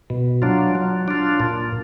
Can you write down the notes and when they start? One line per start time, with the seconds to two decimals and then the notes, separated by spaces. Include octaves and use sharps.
0.10 B2
0.42 F#3 D4 F4
0.75 F#3
1.08 D4 F4
1.40 A#2